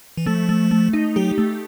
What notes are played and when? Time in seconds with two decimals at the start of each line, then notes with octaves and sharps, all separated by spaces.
0.17 E3
0.26 F3 A3
0.49 A3
0.71 A3
0.93 D#4
1.16 F#3 G4
1.38 A3